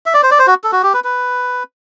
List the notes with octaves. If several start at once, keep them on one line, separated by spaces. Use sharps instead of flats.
E5
D5
C5
D5
C5
F#4
A4
F#4
G4
B4
B4